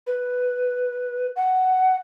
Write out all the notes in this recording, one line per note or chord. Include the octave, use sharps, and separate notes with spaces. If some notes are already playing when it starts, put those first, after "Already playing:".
B4
F#5